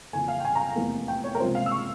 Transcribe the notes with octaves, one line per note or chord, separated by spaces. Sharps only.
F2 C#3 E3 A#3 G#5
F5
G5
G#5
A#5
F1 E2 E3 A#3
G5
C#5
A#4
C#2 C3 F3 A#3 C5
F5
E6
C#6